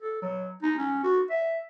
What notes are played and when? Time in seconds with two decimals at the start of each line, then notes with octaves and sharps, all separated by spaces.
0.01 A4
0.22 F#3
0.63 D#4
0.78 C#4
1.03 F#4
1.30 E5